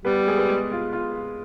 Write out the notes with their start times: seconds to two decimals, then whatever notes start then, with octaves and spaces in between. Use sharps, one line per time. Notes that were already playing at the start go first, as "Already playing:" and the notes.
0.05 G3 B3 B4
0.27 G#3 G#4
0.38 B4
0.49 G#3 G#4
0.72 F4
0.93 F4